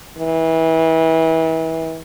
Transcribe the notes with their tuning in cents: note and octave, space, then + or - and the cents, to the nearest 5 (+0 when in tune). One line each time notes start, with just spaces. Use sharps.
E3 -30